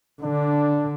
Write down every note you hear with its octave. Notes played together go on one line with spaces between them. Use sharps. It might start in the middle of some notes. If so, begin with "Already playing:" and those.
D3 D4